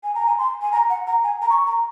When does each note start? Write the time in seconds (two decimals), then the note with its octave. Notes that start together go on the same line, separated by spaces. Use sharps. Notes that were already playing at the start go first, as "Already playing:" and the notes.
0.04 G#5
0.15 A#5
0.27 G#5
0.38 C6
0.62 G#5
0.72 A#5
0.90 F#5
1.07 A#5
1.24 G#5
1.42 A#5
1.50 C#6
1.67 A#5